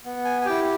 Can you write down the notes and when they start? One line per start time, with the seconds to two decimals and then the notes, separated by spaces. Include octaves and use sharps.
0.05 B3
0.25 G#5
0.41 G#5
0.45 E4 G4 G5